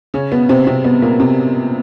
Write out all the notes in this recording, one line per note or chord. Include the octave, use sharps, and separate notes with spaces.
C#3 C#4
B2 B3
C3 C4
C3 C4
B2 B3
A#2 A#3
C3 C4